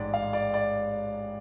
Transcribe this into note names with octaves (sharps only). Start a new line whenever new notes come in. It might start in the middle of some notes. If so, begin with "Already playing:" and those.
Already playing: A1 G#2 G#3 D5
F5
D5
D5